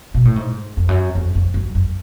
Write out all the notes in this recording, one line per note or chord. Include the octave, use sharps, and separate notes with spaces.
B2
A2
G#2
F2
F#2
F2
F2
F#2
F#2